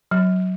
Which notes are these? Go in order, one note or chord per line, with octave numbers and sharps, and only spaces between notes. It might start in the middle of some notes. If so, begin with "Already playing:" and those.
F#3